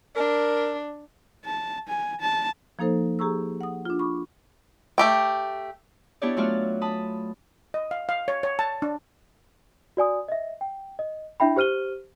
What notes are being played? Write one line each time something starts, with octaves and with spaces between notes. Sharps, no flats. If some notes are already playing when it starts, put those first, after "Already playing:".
D4 A#4
A5
G#5
A5
F3 A#3 D#4 A4 C5
G4 G#4 A#5 C#6 E6
F#5 D#6
D4 F4
B5 C#6 D6
A3 G4 G5
B3 D4 E4 G4 C#5 D5
F#3 A3 F4 F#4 D5 F6
A5 B5 D#6
D#5
F5
F5
C#5
C#5
A5
D4
F#4 D5 G#5 D#6
D#5 E5
G5
D#5
D4 E4 E5 G5 B5
G4 C5 F6 D#7 G7